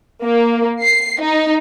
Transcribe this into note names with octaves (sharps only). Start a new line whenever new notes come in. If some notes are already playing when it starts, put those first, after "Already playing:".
A#3
C7
D#4